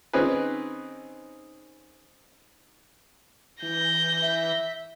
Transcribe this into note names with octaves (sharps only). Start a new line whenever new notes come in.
D#3 C4 C#4 D#4 G#4 B4
E3 G6 A#6
E5